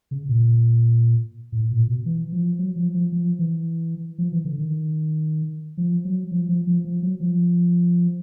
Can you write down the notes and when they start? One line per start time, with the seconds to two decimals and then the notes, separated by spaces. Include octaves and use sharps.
0.11 C#3
0.28 A#2
1.52 A2
1.71 A#2
1.88 B2
2.06 E3
2.32 F3
2.59 F#3
2.76 F3
2.94 F3
3.12 F3
3.39 E3
4.18 F3
4.32 E3
4.45 D3
4.58 D#3
5.78 F3
6.05 F#3
6.31 F3
6.49 F3
6.67 F3
6.85 F3
7.03 F#3
7.20 F3